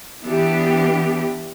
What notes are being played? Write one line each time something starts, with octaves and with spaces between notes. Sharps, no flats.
E3 B3 D4 G4